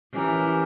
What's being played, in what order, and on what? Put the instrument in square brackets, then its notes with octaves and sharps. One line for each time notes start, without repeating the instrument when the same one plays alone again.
[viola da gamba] E3 [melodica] C#4 G4 A#4